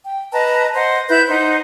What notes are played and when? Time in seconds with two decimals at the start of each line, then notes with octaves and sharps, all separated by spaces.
0.03 G5
0.32 B4 D#5 A5 A#5
0.74 C5 D#5 F#5
1.09 E4 B4 E5 G6
1.28 D#4 C5 F#5